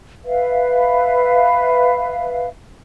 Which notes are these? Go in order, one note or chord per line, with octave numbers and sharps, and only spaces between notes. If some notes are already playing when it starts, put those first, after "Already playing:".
B4 E5 F5